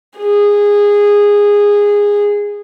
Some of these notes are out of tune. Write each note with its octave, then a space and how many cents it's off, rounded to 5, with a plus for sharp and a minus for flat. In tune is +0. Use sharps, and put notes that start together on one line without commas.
G#4 -15